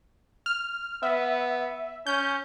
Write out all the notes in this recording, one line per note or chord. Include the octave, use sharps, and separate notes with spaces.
F6
B3 E5
C#4 G6